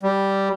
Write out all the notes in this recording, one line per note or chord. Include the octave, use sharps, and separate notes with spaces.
G3